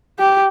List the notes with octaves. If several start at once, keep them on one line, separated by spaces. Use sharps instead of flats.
G4